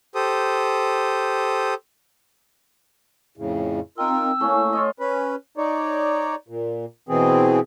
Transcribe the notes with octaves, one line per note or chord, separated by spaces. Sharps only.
G4 A4 C5 D#6
F2 A2 C#3
C4 D#4 F4 A#4 G5 E6
A3 A#3 C#4 E4
F4 C#5 D#5 C#6
C#4 B4
D#4 C#5 D5
A#2
B2 E3 C4 G#4